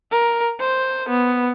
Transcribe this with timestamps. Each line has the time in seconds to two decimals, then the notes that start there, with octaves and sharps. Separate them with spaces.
0.12 A#4
0.60 C5
1.09 B3